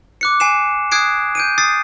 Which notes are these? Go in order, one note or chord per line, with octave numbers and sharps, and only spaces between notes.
D6 F#6 C#7
G#5 C7 E7
D#6 F#6 G#6 C7 D7
G6 D7 D#7
D#6 A6 C7